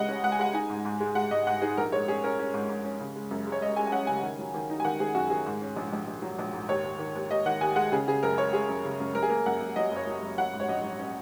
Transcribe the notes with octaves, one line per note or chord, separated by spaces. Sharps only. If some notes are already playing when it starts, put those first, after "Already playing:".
Already playing: C#2 C#3 G#3 D#5 F#5
C#4
C#2 F#5
G#5
G#3 F#5
D#4 G#5
G#2
G#2
G#3
G#3 F#5
G#2 D#5
G#2 F#5
D#4 G#4
A#1 A#4
G#3 C#5
C#4 G#4
C#4 A#4
C#4
G#2
G#2
C#4
C#3
G#3
F#2
G#3
C#5
G#3 D#5
G#3 G#5
G#5
C#4 F#5
C#3 G#5
D#3
F#3
D#3
D#4
G#5
D#3 F#5
D#3 G#4
F#2 F#4
D#3 G#4
G#2
C#4
A#1
A#1
A#1
F#3
A#1
G#2
D#2 C#5
D#2
D#3
D#2
D#2 D#5
D#3 F#5
D#2 G#5
G#3 F#5
C#3 G#4
C#3 G#4
F#2 A#4
G#3 C#5
G#3 G#4
F#2
C#3
F#2
F#2 A#4
G#4
A#3 A#4
F#2 F#5
F#2
F#3 D#5
F#1
C#5
F#3
F#1
F#3 F#5
G#2
C#5
A#1 D#5
F#3
C#4